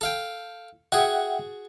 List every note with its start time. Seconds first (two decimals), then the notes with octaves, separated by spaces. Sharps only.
0.01 A4 F5 G5
0.92 F#4 G#4 E5 F#5 G5